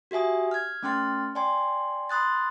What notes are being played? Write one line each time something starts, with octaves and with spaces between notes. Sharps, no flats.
F#4 G4 E5 G#5 D#6
F6 G#6
A3 C#4 G5 C6 F6 A6
D5 G5 G#5 C6
B5 C6 D#6 F#6 A6